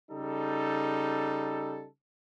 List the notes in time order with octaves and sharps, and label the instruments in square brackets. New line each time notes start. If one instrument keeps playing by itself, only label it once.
[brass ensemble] C#3 G3 D#4 A4